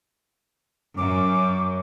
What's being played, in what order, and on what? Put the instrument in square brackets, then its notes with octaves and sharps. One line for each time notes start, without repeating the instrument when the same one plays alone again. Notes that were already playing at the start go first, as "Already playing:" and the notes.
[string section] F#2 [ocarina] D6